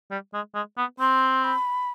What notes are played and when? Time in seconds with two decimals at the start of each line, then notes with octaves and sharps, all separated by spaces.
0.11 G3
0.34 G#3
0.54 G#3
0.78 B3
0.99 C4 C6
1.44 B5